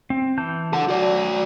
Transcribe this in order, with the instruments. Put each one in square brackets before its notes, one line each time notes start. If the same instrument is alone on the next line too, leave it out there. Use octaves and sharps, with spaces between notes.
[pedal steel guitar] C4
E3 A5 G6
[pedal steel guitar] F#3 A5 [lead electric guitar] A4 F#5
[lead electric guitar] F#4 D5